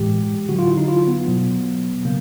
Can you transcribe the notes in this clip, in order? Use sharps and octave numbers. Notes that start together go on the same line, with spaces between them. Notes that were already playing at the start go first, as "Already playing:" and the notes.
Already playing: A2 E3 G#3 G4
D3 F#3 F#4
F4
E4
D#4
F4
B3
B2 F#3
C#3 F#3 A#3